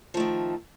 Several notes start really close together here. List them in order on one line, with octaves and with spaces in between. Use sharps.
F3 A3 D#3